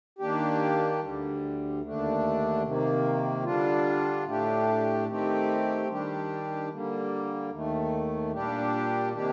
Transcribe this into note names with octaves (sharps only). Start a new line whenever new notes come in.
D#3 A#3 D4 G4
D2 D3 G3
D#2 D3 A3 D4
C3 D#3 A#3
D3 G3 D4 F4
A2 A3 D4 G4
D#3 A3 C4 G4
D#3 G3 D4 G4
D3 G3 A#3
D#2 D#3 A3
A#2 G3 D4 G4
C3 D#3 A#3 D4 G4